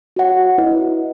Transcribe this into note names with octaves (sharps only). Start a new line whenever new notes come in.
F#4 C#5 F#5
E4 B4 D#5